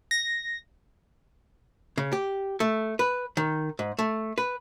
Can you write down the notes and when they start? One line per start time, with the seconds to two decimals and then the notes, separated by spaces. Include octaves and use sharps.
0.11 A#6
1.98 C#3
2.13 G4
2.60 A3
2.99 B4
3.37 D#3
3.79 G#2
3.99 A3
4.38 B4